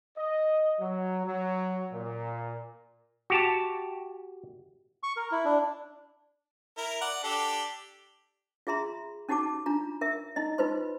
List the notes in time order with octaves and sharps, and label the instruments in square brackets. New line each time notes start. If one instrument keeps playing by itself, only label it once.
[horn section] D#5
F#3
F#3
A#2
[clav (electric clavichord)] F#4 G4 A5
[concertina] C#6
A#4
E4
D4
[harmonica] E4 A#4
D5 F#5
D4 G4 A4
[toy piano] F4 G#4 E5 A#5 C6
C#4 D#4 F#4 G4 A5 D6
D4 F4 A#5
A#4 E5
D#4 E4 D#5
D#4 F4 B4 C5 C6